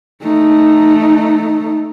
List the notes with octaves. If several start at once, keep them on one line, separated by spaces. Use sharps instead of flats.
A3 D#4